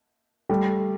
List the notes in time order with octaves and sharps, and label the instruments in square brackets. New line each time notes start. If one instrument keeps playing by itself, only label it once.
[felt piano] G3 A3